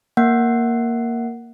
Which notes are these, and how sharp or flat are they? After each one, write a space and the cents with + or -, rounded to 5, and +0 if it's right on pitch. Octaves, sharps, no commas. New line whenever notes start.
A#3 +0 F#5 +0